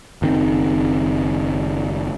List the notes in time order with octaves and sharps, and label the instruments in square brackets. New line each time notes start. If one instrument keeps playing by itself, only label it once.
[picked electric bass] F#1 D#3 C4